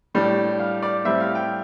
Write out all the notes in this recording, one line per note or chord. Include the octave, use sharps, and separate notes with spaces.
A2 G3 D4
F5
D5
A2 G3 C4 E5
F5
G5